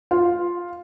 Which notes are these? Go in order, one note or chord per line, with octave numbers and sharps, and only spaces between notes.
F4